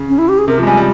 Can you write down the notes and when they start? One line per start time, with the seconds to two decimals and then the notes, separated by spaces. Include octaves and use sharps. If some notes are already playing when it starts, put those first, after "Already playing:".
Already playing: C#3
0.09 C#4
0.18 E4
0.29 G4
0.38 G#4
0.48 C3 A#4
0.58 F3
0.63 G#3
0.67 G3 G#5
0.77 G3